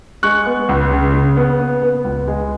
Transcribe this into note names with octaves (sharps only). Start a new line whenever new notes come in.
G#3 C#6 F#6
B3
C#2
C#3
C#3
B3
B3
B3
C#2
G#3